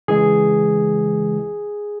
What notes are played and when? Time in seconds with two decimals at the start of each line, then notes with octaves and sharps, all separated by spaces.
0.08 C#3 E3 G#3 G#4